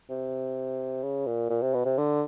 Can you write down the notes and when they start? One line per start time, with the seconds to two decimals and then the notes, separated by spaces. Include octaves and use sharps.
0.09 C3
1.03 C#3
1.27 A#2
1.50 A#2
1.62 C3
1.74 B2
1.85 C3
1.98 D3